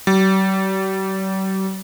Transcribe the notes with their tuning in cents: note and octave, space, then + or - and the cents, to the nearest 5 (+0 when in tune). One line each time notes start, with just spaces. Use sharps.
G3 -45